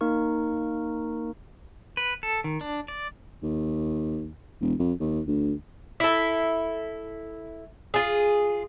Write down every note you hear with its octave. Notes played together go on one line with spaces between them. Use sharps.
A#3 D#4 A#4 C#6
B4
A4
D#3
D4
D5
D#2
E1
F2
D#2
D2
E4 A4
F4 G#4